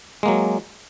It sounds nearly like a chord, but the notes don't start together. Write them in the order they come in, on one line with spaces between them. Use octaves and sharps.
G#3 A#3 F#3